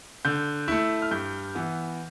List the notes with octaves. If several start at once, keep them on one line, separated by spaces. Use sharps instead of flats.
D3 G6
A3 E4
F6
G2 G6
E3 B3